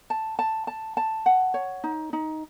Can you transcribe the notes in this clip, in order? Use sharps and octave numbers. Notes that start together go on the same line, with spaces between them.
A5
A5
A5
A5
F#5
C#5
D#4
D#4